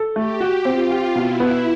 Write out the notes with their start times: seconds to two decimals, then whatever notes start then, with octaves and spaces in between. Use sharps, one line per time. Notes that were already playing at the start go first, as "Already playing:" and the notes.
Already playing: A4
0.16 A3 G4
0.41 F#4
0.65 C4 F4
0.91 G4
1.15 B2 E4
1.40 B3